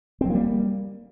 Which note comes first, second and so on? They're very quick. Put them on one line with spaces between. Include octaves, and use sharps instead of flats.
C4 F#3 A#3 G3